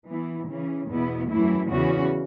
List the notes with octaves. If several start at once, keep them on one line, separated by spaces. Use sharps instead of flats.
E3 B3 E4
C#3 E3 C#4
E2 B2 B3 E4
F#2 E3 A3 E4
E2 C#3 E3 C#4 F#4